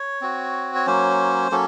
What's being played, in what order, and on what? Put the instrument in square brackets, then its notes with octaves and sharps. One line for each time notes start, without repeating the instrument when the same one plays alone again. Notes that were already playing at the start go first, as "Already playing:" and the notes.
Already playing: [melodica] C#5
C4 F#4
C#5
F#3 A#3 C#4 C5
F#3 A#3 C#4 A4